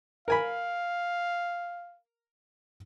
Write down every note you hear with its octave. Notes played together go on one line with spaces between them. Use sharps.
A#4 F5 G#5 B5